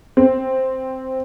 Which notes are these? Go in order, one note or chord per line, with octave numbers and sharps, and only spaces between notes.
C4